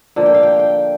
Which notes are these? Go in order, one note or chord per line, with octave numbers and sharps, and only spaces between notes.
D3 F3 A#3
G5
F5
G5
G5